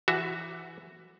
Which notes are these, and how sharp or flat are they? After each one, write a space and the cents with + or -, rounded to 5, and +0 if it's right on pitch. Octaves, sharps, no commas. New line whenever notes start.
E3 +20 F#4 +0 E5 +10